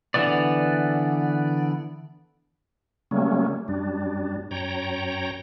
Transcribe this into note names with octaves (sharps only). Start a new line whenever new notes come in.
D3 E3 B3 D5
C#3 F#3 G3 A3 A#3 C#4
F#2 G3 D4
F#2 C#5 G5 A#5